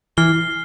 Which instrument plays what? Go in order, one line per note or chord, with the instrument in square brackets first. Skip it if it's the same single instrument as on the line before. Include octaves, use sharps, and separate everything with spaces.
[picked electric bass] E3 [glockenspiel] F6 C7 G7